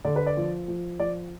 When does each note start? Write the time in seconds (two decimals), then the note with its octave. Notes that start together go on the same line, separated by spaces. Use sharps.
0.05 D3 D5
0.16 B4
0.27 D5
0.37 F3
0.68 F3
1.00 F3 D5